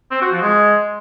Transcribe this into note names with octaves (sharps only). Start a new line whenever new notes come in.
C4
F#4
F3
G#3